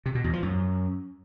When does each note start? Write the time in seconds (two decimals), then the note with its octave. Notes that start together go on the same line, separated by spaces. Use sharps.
0.06 C3
0.15 B2
0.24 E2
0.33 F3
0.43 F#2